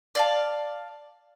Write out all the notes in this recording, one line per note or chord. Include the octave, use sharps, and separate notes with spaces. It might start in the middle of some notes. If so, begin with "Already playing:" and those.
D5 F5 A5